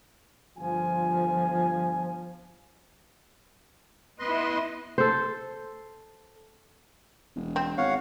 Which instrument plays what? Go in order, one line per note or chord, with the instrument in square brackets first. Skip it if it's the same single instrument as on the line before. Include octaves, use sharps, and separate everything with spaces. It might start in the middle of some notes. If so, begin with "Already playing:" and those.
[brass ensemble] G1 F4 G#5 [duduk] F3
[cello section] B3 E4 [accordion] B4 D#5 C6
[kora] A4 C5
[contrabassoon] E1
[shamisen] C4
[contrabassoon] G#1 [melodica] C#5 F5 F#5